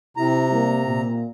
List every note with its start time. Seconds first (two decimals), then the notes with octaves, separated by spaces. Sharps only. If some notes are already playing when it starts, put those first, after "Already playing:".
0.17 C3 E4 A#5
0.51 G3 A#3
0.86 A#2